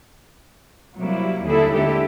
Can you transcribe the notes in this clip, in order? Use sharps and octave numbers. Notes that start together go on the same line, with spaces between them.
C3 F#3 G3 A#3 E4
D#2 D3 G3 E4 G#4 A4
D3 G#3 E4 G4 A4